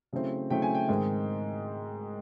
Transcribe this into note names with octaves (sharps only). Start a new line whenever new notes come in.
C#3 F#3 A3 C4 E4
C#3 F#3 A3 C4 E4 G5
G#5
G5
G#2 D#3 G#3 C4